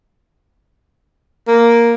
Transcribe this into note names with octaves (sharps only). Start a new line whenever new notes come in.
A#3